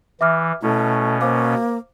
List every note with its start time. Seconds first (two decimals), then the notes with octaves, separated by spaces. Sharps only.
0.21 E3 E5 D6 F6
0.62 B2 A3 C#4 E4
1.21 A#3 C5 F5 D6